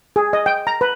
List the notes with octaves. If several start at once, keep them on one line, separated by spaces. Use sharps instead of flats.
G#4
D#5
G5
A#5
B4